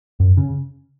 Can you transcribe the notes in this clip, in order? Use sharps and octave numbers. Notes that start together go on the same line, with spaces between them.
F#2
C#3